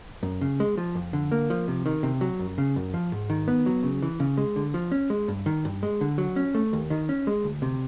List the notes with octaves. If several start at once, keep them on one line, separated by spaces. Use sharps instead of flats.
F#2
C#3
G#3
F3
F2
D3
A#3
F3
C3
D#3
C3
F#3
F#2
C#3
F#2
F3
G#2
D#3
B3
F#3
C#3
E3
C#3
G#3
D3
F3
C#4
G#3
G2
D#3
G2
G#3
D3
F#3
C#4
A3
D#2
D#3
C#4
G#3
D2
C3